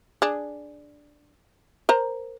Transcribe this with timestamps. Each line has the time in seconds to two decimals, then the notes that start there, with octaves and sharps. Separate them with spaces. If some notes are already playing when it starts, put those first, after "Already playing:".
0.22 D4 G#4
1.89 A#4 C5 A#5